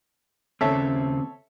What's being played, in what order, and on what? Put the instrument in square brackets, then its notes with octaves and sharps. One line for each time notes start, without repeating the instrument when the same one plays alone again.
[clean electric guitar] D#2 C#3 C4 [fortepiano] A4 C#5 E5